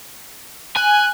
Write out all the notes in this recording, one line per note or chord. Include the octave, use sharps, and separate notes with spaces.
G#5 F#6